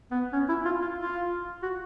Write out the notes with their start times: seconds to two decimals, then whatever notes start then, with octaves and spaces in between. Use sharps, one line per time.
0.11 B3
0.33 C#4
0.49 E4
0.65 F4
0.82 F4
0.98 F4
1.63 F#4